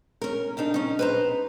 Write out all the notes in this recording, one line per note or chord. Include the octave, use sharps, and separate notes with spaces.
C#4 A#4
C#3 D4 D#4 A4
C#4 D#4
B4 C5 A#5